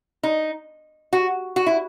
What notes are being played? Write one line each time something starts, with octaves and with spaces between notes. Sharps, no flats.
D#4
F#4
F#4
E4